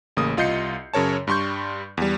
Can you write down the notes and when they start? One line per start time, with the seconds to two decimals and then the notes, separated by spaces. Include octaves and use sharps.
0.17 A1 C#3 A#3 D#6
0.37 C2 F4 D#5 G6 C7 C#7
0.94 F#2 C#3 A#4 C#5 A5
1.27 G2 G3 C6 C#6 G6
1.97 E2 G3